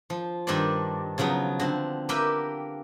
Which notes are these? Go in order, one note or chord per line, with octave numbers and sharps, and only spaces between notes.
F3
G2 D#3 D4 A4 C5 D5
C#3 F3 F#3 B3 D#4
D3 C4
A#3 G4 A#4 B4 E5 G5